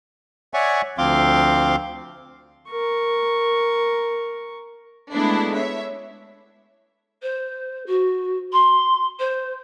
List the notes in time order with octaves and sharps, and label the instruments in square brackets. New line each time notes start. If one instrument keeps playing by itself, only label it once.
[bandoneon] C#5 D5 E5 F#5 G#5 C#6
D2 F3 C4 F5 C6 D6
[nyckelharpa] A#4 C#6
[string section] G#3 A3 B3 D4 E4
C#5 E5
[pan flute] C5
F#4
C6
C5